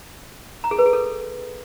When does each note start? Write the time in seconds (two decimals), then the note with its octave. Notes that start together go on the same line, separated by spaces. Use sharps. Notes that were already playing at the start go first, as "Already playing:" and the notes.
0.64 A#5
0.71 G#4
0.79 B4
0.86 G#4
0.93 A4